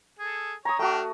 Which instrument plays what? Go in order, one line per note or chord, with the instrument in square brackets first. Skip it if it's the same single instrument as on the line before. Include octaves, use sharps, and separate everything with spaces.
[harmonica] G#4 A4
[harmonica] C#5 [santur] A#5 D#6
[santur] A3 F#4 [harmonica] D4 G5 F6